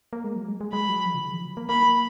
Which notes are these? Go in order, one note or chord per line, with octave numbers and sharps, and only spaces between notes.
A#3
G#3
F#3
G#3
G#3
G#3 B5
F#3
F3
C#3
D#3
F3
F#3
A#3
A#3 B5